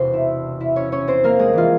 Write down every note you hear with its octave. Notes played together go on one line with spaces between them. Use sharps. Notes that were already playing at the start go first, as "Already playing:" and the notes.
Already playing: E1 E2 C3 C5 C6
E4 E5
E4 E5
C#4 C#5
C#4 C#5
C4 C5
A#3 A#4
G#3 G#4
E3 G#3 F4